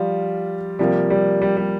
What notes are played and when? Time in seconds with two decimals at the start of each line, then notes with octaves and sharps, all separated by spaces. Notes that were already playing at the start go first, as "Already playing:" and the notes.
Already playing: F3 G3 F4
0.79 C3 F3 G3 A#3
1.10 G3
1.42 G3
1.57 G3